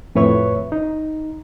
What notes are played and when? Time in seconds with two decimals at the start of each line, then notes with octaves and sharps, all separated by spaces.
0.15 F2 A2 B4 C#5 E5 C#6
0.72 D#4